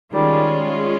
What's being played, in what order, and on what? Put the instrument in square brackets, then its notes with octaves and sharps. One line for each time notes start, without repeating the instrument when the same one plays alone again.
[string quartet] D#3 G3 [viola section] G#3 C#4 F4